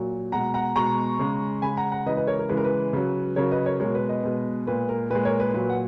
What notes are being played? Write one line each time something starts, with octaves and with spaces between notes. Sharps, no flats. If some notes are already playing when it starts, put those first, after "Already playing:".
Already playing: A#2 F#3
B2 G#3 F#5 A#5
F#5 A#5
B2 G#3 A#5 C#6
C#3 G#3
C#3 G#3 G#5 B5
F#5 A#5
F#5 A#5
C#3 E3 G#3 B4 D#5
B4 D#5
A#4 C#5
A#4
C#3 E3 G#3 B4
A#4
B4
C#3 F#3
C#3 F#3 A#4 C#5
B4 D#5
A#4 C#5
B2 G#3 A#4 C#5
B4
B4 D#5
B2 G#3
A#2 G#3 B4
A#4
A#2 G#3 B4
A#4 C#5
B4
A#2 F#3 B4
F#5